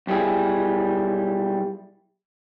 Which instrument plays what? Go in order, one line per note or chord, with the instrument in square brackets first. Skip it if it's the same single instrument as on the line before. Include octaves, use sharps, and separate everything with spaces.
[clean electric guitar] B1 G3 E4 G#4